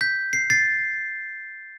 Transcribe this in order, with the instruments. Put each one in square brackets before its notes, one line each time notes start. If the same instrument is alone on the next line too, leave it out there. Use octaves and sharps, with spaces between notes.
[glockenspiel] G6 B6
C7
A6 C7